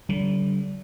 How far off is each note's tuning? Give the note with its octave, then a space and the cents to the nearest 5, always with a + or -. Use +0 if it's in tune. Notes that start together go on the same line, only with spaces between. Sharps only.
D3 -40 G3 -45